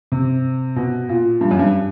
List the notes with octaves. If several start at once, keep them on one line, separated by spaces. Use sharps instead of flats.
C3
B2
A#2
G2
F#2
G2